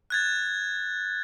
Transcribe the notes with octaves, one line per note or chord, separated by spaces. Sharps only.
F#6 G#6 A6